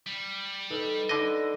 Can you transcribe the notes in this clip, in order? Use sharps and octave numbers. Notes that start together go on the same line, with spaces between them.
G3
D#4 A4 B4
D3 D#4 A4 D5 D#5